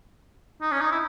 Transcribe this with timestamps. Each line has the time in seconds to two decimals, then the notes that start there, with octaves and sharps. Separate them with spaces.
0.61 D#4
0.72 C#4
0.81 D#4
0.91 E4